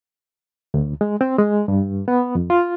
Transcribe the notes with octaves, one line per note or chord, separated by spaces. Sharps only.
D2
G#3
C4
G#3
G2
B3
F2
F4